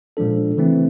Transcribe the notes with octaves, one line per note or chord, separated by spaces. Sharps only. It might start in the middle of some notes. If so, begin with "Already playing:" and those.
A#2 F3 G#3 D4 A4
C#3 E3 A3 C4